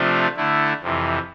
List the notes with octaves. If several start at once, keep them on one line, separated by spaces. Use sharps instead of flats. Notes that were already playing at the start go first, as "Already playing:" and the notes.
Already playing: C3 F3 A3 D4 F4
D3 A3 E4
F2 C3 E3